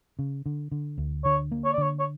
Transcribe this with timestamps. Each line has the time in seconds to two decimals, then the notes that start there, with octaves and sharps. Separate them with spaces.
0.19 C#3
0.46 D3
0.72 D3
0.98 D2
1.24 D3 C#5
1.52 A#3
1.65 C#5
1.73 D5
1.78 D3 C#5
1.99 C#5